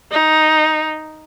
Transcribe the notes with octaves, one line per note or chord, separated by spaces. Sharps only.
D#4